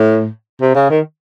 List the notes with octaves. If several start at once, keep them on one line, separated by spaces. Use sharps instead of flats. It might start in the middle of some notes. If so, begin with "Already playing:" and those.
Already playing: A2
C3
C#3
D#3